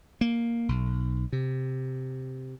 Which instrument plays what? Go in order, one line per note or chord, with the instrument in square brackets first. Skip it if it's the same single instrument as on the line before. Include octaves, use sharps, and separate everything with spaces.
[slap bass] A#3
B1
C3